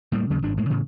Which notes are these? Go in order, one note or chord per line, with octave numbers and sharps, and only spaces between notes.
A2 G3 A#3
D#2 C#3 F#3
G#1 G2 D4
A2 G#3 A#3
A2 C#3 E3